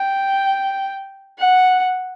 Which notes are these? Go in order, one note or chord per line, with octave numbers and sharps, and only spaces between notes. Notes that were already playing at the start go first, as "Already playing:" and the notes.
Already playing: G5
F#5